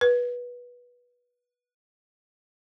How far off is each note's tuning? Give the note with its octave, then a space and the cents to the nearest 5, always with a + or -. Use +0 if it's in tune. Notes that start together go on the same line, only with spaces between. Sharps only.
B4 -20